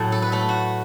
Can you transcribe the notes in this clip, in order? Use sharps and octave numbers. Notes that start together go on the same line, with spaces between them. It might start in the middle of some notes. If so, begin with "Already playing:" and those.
Already playing: A2 F#3 A3 E4
A4
B4
A3 A4
F#4